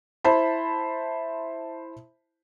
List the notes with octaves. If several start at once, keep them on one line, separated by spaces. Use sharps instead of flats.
E4 C5 A5 B5